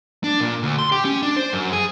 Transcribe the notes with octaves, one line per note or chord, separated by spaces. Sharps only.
D4
A#2
D2
C6
G4
C#4
D4
C5
F#2
G#4